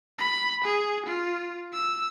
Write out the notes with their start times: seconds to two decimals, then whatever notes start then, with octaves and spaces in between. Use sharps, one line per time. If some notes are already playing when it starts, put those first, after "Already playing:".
0.19 B5
0.64 G#4
1.06 F4
1.73 E6